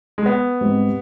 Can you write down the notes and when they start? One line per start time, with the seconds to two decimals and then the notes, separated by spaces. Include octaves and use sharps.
0.18 G#3
0.26 B3
0.61 G#2 G3 C4